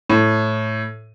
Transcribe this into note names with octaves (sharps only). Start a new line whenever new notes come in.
A2